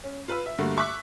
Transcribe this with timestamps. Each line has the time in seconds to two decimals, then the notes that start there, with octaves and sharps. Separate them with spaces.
0.04 C#4
0.28 F4 B4 B5 E6
0.46 E5
0.58 G2 D3 A3 A#3 F#4
0.77 E5 C#6 D6 F#6 B6